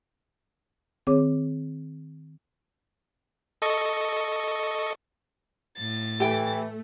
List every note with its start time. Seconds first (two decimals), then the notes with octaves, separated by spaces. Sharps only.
1.07 D#3 C4 G#4 C#5 D6
3.62 A4 D#5 C#6
5.76 A2 A6
6.20 E3 A3 G4 G5